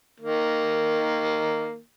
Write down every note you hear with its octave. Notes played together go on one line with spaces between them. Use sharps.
D#3 A#3